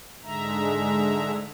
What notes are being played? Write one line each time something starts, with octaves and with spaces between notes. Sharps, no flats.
G#2 D3 G#3 E5 A#5